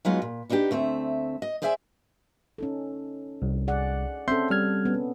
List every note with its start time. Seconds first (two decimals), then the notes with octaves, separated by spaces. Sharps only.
0.05 F#3 G#3 B3 D#4 F4 F#4
0.22 A#2
0.49 B3 D4 D#4 F4 G4
0.71 D2 A3 C4 E5
1.42 D#5
1.62 G#4 C5 D5 E5 F#5 G#5
2.58 C#4 D#4 A4
3.42 C2
3.67 G#4 D5 F#5
4.28 C4 C#4 A4 E5 C6 G6
4.50 G3 F6 G#6
4.85 B3 C#4